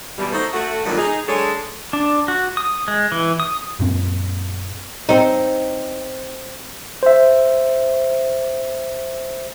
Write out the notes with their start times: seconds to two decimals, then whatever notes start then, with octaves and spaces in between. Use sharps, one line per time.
0.18 B2 E3 G3
0.32 A3 D#4 F#4 A4 C5
0.53 A3 F#4
0.86 G2 A#2 D3 D#3 F#3 G3
0.98 D#4 G#4
1.27 F#3 G#3 D4 G#4 A4 C#5
1.93 D4
2.28 F#4
2.57 D#6
2.88 G#3
3.12 E3
3.40 D#6
3.79 F#2 A#2 C4
5.09 C4 D#4
7.03 C5 E5